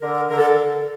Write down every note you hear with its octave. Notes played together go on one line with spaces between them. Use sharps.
D3 A#4
D3 A#4
A4